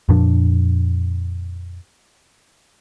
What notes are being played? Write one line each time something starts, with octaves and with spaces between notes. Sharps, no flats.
F2 A#2 F3 D4